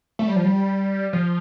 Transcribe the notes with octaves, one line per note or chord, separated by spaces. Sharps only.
A3
G3
F3
G3
F3